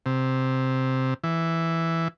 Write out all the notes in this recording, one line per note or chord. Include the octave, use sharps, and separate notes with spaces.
C3
E3